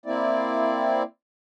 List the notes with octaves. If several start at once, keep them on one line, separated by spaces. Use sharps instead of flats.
A#3 C4 E4 D5